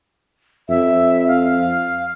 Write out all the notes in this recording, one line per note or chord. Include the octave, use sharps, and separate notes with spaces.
F2 E5
F5